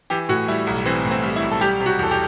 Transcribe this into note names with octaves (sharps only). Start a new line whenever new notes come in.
E3 G4
A2 F#4
G3 E4
B1
E3 C4
A2
C4
G3
E4
B1
A4
G3 G4
C3
F#4
E2 A4
G4